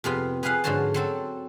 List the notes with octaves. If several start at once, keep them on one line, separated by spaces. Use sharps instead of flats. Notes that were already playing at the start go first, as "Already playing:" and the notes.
F2 C3 B3 F4
B3 G#4 B4 F5 F#5
G#2 D3 F3 F#4 C#5 A5
F#3 C4 A4